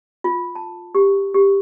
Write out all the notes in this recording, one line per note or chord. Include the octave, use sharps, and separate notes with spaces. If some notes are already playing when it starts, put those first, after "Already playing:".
F4
A5
G4
G4